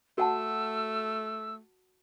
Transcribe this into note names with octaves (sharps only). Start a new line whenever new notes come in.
A3 F#4 F#5 A5 E6